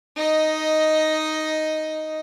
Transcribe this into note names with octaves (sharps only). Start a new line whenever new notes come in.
D#4 D#5